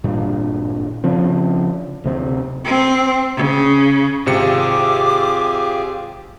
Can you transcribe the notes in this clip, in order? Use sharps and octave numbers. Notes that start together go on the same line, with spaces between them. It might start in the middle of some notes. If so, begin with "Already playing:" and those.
G#1 G2 A#2 G3
C#3 F3 C4
D1 C3 C4
C4
C#3
G#1 C3 F4 G4 G#4 D6 C#7